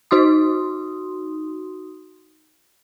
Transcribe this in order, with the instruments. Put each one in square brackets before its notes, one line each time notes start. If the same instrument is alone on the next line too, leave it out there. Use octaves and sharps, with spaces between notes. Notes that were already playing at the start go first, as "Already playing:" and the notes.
[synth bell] D#4 F#4 C6 D#6